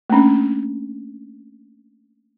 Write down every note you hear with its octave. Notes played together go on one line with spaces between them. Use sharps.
A3 A#3 C#4 D4